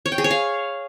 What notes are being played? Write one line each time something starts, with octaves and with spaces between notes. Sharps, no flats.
C#5
G5
G#4
C#5
F5